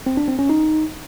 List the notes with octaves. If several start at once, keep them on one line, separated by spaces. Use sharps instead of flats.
C4
D4
C4
C#4
D#4